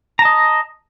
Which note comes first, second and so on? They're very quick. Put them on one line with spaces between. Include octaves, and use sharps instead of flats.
A#5 A5 D#5